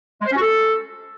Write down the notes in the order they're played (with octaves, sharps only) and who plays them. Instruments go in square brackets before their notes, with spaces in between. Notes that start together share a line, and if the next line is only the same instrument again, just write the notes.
[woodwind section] G#3
C5
C#4
F#4
A4